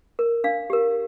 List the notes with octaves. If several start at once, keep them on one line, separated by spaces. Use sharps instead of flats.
A#4
D4 F5
G4 A#4